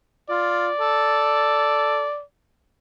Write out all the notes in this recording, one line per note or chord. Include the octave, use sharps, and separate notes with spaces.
F4 D5
A4